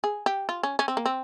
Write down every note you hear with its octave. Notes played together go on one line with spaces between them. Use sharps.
G#4
G4
F4
C#4
C#4
C4
A#3
C4